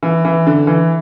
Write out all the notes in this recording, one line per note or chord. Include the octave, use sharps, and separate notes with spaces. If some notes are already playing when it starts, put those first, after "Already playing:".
E3
E3
D3
E3